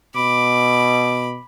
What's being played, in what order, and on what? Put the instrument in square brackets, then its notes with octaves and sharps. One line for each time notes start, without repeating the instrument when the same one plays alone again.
[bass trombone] B2 [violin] B5 [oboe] D6